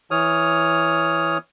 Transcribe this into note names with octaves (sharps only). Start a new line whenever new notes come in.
E3 C#5 D#6 F6